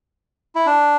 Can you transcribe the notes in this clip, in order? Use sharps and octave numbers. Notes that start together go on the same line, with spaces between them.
E4
D4